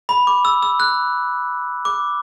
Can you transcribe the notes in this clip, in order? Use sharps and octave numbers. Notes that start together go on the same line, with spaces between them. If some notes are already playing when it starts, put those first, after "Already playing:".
B5
D6
E6
E6
F#6
D6